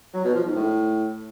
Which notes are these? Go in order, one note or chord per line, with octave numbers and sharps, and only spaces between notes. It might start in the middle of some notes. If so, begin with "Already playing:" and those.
F#3
B2
F3
G#2
A2